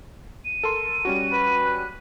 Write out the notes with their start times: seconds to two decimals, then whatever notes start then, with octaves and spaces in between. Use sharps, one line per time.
0.45 D#7
0.63 A4 A#4 C6
1.05 G3 C#4 F#4
1.32 B4
1.65 F#6